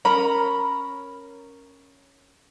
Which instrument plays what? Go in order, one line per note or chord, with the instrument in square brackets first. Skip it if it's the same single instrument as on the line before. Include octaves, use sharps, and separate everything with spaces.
[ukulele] C#4 A#4 A#5 B5